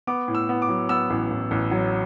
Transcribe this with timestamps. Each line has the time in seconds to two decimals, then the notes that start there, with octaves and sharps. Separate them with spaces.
0.07 B3 D6
0.28 A2
0.35 E6
0.49 B3
0.62 D6
0.69 F#3
0.89 B3 E6
1.10 A1
1.31 A1
1.51 A1
1.71 F#3